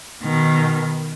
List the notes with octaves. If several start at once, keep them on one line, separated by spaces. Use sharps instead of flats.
B2 D#3